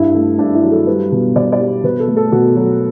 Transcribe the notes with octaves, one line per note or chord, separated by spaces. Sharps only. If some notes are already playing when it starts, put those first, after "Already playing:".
Already playing: G2 E4
A3
G2 D4
E4
F#3
A4
G3 B4
B2
B2 D5
D5
G3
B2 B4
A4
A3
A4
B2 F#4
F#3